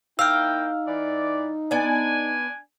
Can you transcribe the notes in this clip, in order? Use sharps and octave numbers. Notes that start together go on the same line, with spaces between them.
A#3 D#4 E4 F5 G5 E6 F6
E3 D5
B3 D4 D5 G#5